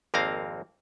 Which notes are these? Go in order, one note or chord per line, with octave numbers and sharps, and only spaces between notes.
G#1 F2 A#3 C4 F5 A#5